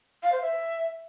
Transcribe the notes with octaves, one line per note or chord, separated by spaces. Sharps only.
F5
C5
E5